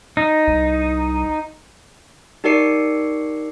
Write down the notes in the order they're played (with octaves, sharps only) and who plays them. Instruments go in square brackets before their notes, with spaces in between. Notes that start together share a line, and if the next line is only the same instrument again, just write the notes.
[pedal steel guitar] D#4
[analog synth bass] C2
[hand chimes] D#4 G4 A#4 D5 C7 C#7